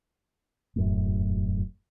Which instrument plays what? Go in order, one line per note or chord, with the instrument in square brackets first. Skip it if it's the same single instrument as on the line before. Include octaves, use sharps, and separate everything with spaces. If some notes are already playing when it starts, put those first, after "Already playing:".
[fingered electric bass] E1 F#2 A2